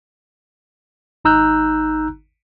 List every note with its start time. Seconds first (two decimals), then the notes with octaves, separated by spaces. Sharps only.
1.25 G#1 D#4 A#5 E6 F#6 G6